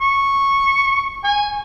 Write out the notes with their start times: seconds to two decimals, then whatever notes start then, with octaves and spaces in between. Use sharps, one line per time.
0.01 C#6
1.24 G#5